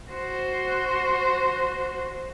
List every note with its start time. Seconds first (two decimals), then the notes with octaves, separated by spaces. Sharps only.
0.11 F#4 C5